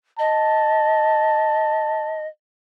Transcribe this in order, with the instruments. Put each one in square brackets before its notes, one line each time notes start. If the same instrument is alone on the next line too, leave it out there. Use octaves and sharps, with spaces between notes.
[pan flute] D#5 [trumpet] A5